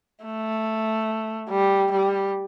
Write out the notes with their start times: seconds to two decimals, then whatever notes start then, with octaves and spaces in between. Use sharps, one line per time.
0.25 A3
1.50 G3
1.92 G3